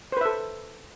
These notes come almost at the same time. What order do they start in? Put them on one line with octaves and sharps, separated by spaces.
C5 B4 E5 A4